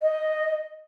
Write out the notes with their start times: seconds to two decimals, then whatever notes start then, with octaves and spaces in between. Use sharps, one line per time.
0.01 D#5